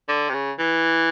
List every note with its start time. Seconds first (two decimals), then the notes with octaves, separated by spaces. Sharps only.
0.09 D3
0.29 C3
0.33 C#3
0.59 E3